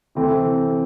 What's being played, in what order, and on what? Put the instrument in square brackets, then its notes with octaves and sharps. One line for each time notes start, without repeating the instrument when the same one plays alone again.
[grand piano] C3 E3 A3 C4